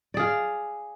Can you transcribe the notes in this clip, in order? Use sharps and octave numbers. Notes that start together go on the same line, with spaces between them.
G#4 D5 F5